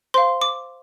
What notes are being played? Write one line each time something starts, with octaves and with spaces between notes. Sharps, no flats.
C5 F5 C6
D6